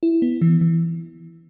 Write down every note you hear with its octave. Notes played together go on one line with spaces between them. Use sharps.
E4
B3
E3
E3